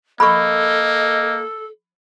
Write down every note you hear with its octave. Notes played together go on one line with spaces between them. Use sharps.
A#3 A4 D#5 B5 C#6